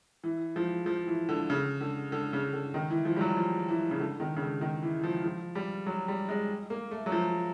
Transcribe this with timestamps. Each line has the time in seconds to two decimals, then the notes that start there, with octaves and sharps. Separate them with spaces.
0.24 E3
0.56 F3
0.86 F3
1.07 E3
1.29 D3
1.50 C#3
1.81 D3
2.12 D3
2.33 C#3
2.53 D3
2.74 D#3
2.90 E3
3.05 F3
3.16 G3
3.21 F#3
3.37 F3
3.68 E3
3.91 C#3
4.00 D3
4.20 D#3
4.36 C#3
4.41 D3
4.61 D#3
4.83 E3
5.03 F3
5.24 F3
5.55 G3
5.86 F#3
6.08 G3
6.29 G#3
6.70 A#3
6.91 A3
7.06 F#3
7.12 F3